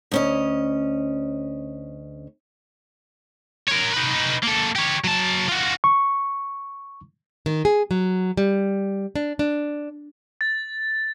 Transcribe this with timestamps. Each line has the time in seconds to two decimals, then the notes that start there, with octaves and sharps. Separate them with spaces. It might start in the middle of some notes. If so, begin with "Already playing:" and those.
0.12 D2 C#4 D#5
3.68 A#4 C#5
3.93 D#4 B4
4.43 A#3 A4
4.75 G4 C#5
5.04 F#3 A5
5.48 F4 F#4
5.84 C#6
7.46 D#3
7.65 G#4
7.91 F#3
8.37 G3
9.16 D4
9.39 D4
10.41 A6